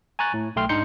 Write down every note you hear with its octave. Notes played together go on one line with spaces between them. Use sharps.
G#5 A#5 C#6 F#6 A6
A2
B1 A3 G5 C6 F6
G#2 D4 D#4 C6 G6 C#7